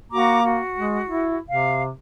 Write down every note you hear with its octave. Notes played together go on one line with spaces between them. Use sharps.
A#3 F#4 A#5 D6
F#4
G#3
E4
C3 F5